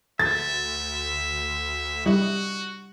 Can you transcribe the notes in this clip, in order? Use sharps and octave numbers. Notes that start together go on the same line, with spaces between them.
D2 E5 A6
G3 E4 F#4 D#5